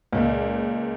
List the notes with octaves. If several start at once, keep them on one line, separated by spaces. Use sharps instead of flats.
C#2 A#2